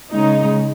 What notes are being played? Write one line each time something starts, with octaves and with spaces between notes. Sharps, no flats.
C#3 G#3 D#4